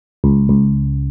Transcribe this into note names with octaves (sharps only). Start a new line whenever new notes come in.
C#2
C#2